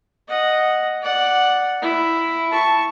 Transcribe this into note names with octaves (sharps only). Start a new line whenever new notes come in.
D#5 F#5
D5 F#5
E4
A5 C#6